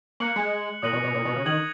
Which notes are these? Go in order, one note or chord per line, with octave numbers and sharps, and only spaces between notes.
A#3 F#6 C#7 F#7
G#3
A#2 D#6 F#6 A#6 D#7 F#7
B2
B2
A#2
B2
C#3
D#3 D#6 G#6 D#7 F#7